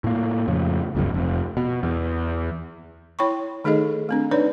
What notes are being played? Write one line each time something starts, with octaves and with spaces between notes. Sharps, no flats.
A2 A#3
F2 A2 C#3
G1 C#2 F#2
F1 F2
B2
E2
E4 C#5 G5 B5 C#6
D#3 A3 D#4 G#4 A4 D#5
A3 C4 D4
D4 D#4 B4 C#5 D5